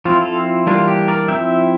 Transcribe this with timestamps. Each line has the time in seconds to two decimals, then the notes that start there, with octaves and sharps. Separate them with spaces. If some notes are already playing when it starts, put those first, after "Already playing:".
0.05 F3 C4 E4 F4
0.21 F4 A4
0.66 E3 G3 A#3 D4 F4
0.88 G4
1.08 A#4 D5
1.28 F3 C4 E4 E5 G5